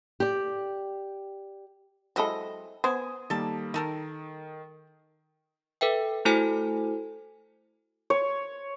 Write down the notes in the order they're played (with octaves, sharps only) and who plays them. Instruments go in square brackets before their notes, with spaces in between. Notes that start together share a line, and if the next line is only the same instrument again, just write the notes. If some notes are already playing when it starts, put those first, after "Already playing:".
[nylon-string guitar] G4 D5
[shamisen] F#3 G#3 A4 [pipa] C4 E4 D#5
[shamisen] B3 C5 [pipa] G#5 [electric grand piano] D#6
[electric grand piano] D#3 G3 A#3 [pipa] A4 A5
[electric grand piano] D#3 [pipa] D#4 A4 A#4
[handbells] A4 B4 E5 G5
A3 E4 F#4 A4 C5 G#5
[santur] C#5